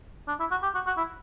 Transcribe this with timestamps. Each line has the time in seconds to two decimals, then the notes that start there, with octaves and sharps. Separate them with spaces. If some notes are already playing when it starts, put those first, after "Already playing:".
0.28 D4
0.40 E4
0.51 F#4
0.63 G4
0.75 F#4
0.87 F#4
0.98 E4